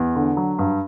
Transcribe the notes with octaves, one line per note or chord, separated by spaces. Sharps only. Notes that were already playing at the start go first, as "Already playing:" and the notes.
Already playing: E2
D3
F#3
G2